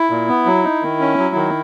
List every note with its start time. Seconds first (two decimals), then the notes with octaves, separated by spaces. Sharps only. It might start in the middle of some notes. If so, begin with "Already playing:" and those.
Already playing: E4
0.10 A#2
0.28 B3
0.46 F#3
0.64 D#4
0.82 D#3
1.00 C#4
1.18 F#3
1.35 D#3